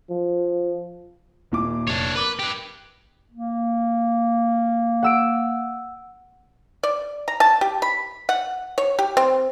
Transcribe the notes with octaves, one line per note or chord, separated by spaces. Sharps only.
F3
D#1 A#2 D6
F1 D4 C#5
A#4 B4 D6 G7
G4 B4
A#3
F#5 E6 D7
D5
A#5
A5
G4
B5
F#5
C#5
G4
C4